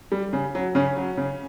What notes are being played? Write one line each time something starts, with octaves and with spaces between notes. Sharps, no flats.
G3
C#3
F#3
C#3 C#4
F#3
C#3